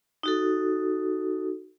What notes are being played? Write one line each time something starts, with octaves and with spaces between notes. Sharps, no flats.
D#4 F#4 A4